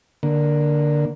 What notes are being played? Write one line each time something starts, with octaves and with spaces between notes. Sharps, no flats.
D3 A#3